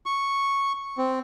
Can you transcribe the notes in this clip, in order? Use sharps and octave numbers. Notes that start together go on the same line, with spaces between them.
C#6
C4